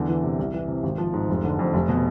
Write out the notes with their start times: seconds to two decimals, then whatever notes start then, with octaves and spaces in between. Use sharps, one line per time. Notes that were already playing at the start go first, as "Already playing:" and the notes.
Already playing: E2 D3
0.08 E3
0.23 C3
0.39 C2
0.54 E3
0.68 C3
0.83 G#1
0.98 F3
1.13 G#2
1.29 F1
1.44 D3
1.59 F2
1.74 F1
1.89 B2